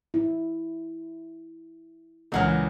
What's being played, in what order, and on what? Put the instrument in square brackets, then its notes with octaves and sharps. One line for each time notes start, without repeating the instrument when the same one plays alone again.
[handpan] E4
[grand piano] C#2 F#5 F6 [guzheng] A#2 E3 F#3